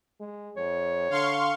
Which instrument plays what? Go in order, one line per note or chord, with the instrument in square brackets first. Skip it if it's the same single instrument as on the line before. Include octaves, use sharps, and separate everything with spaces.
[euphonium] G#3
[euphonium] F2 [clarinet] C#5
[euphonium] D3 [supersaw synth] F5 C6 C#6